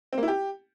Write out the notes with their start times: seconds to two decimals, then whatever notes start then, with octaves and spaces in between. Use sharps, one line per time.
0.13 C4
0.18 A#3
0.23 E4
0.28 G4